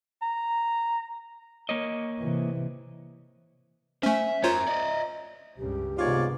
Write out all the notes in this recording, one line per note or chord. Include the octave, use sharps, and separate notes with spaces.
A#5
A#3 C#5 D#5
C3 E3
A3 C#4 C5 E5 G#5
C#4 F4 A#4 C5 C#5 A#5
D5 D#5
C#2 G2 C#3 G4
G#2 C3 D#3 B3 F4 C#5 D5